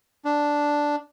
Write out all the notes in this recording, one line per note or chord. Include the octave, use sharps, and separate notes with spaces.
D4